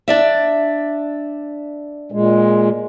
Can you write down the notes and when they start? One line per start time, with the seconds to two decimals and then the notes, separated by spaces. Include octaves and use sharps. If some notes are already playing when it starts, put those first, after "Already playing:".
0.08 D4 D5 E5
2.12 A#2 G#3